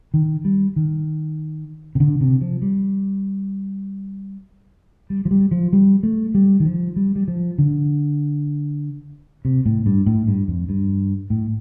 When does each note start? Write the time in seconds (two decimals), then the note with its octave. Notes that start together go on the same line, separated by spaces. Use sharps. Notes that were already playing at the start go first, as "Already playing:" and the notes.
0.14 D#3
0.45 G3
0.76 D#3
1.95 C3
2.00 D3
2.21 C3
2.41 F3
2.62 G3
5.10 G3
5.25 F3
5.31 G3
5.51 F3
5.73 G3
6.03 A3
6.35 G3
6.60 D#3
6.65 F3
6.96 G3
7.16 G3
7.28 F3
7.58 D3
9.45 C3
9.66 A2
9.86 G2
10.06 A2
10.28 G2
10.48 F2
10.69 G2
11.30 A2